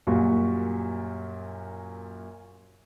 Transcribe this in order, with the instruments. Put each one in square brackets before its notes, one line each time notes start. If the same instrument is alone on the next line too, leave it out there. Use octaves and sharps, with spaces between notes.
[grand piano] F#2 A#2 G3 F4 F#4